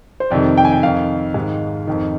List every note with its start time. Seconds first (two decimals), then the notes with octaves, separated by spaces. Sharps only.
0.20 C5
0.31 F2 C3 D#3 D5
0.57 G5
0.65 G#5
0.73 G5
0.83 F2 D#3 F5
1.34 G#2 D#3
1.87 F2 D#3